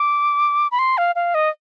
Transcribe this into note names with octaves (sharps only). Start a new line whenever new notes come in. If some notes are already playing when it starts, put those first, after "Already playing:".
Already playing: D6
B5
C6
F5
F5
D#5